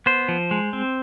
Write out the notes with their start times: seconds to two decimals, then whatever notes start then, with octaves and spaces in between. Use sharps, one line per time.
0.06 B3 C5
0.28 F3
0.51 G#3
0.73 C4